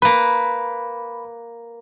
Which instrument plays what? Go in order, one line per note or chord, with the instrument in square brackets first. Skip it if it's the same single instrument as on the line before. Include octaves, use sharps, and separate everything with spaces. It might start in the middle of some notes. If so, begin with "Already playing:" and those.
[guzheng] A#3 B4 [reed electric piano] B5